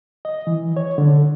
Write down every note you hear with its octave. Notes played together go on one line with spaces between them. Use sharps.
D#5
E3
C#5
D3